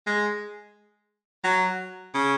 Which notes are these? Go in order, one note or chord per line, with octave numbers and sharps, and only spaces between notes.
G#3
F#3
C#3